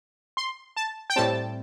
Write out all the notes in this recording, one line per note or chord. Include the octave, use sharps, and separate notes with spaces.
C6
A5
G5
A2 G3 C4 A5